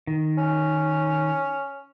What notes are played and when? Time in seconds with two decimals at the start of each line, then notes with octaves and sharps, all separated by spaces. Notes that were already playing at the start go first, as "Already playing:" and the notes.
0.07 D#3
0.38 C#4